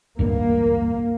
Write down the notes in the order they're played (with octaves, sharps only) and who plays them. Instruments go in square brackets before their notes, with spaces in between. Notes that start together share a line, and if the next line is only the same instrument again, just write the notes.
[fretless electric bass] A1 D2 G2 [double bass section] A#3